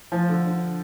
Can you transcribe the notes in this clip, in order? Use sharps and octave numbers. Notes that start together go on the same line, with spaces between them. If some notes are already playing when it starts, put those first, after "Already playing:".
F3
D3
D3